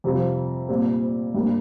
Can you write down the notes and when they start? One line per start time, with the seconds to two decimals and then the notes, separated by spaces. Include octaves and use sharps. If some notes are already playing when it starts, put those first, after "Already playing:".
0.04 F2 C3 G3 C4 F4
0.69 A#2 G3 C4
1.34 G2 G3 A#3